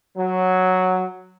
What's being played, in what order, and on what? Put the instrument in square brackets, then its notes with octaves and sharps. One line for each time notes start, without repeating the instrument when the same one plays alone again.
[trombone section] F#3